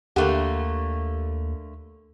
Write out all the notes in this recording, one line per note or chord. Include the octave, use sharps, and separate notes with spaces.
D#2 D3 A3 A#3 G4 A4 F#5